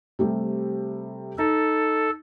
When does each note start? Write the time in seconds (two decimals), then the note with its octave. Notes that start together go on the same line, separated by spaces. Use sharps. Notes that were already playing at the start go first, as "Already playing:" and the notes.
0.19 C3 G3 A3
1.38 D#4 A4